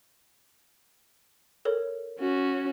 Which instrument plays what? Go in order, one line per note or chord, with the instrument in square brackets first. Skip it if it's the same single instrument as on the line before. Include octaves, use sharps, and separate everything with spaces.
[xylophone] A4 A#4 C#5
[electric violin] C#4 F#4